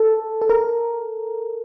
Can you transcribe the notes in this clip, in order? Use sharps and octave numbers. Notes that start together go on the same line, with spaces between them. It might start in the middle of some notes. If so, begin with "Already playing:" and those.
Already playing: A4
A4
A#4